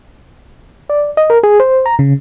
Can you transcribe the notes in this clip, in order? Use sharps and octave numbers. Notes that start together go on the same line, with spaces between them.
D5
D#5
A#4
G#4
C5
A#5
C#3